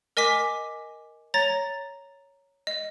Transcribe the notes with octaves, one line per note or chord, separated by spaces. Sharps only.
A#4 D#5 G#5 D6 B6
C#5 A#5 A6 A#6
D#5